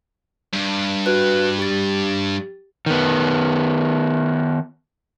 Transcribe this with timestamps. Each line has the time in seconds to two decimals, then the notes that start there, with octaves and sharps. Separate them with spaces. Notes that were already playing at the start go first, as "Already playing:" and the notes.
0.53 G2
1.06 F#4 B4 F#6
1.59 G4 A6
2.86 D#3 B3